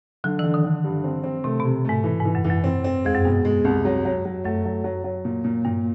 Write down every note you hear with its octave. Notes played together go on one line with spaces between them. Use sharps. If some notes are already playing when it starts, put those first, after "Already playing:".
D3 F#3
D3 E3
D#3
D3
G2
C4
C4
C3 A3
B2
C3
G#2 A3
E3
G#2 E3
F#2
E3
F#2
C4
C4
F2 G#3
F#2
G2 B2
G#3
C2
F#3
F#3
F#3
F#2 A3
F#3
F#3
F#3
A#2
A#2
G2 A#2